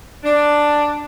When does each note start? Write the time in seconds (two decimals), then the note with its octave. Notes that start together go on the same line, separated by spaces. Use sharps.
0.24 D4